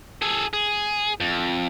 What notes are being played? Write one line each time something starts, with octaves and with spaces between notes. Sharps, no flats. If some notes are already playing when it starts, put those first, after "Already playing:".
G#4 A4
G#4
F2